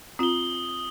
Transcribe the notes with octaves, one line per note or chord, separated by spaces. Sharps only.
C4 F4 D#6 G7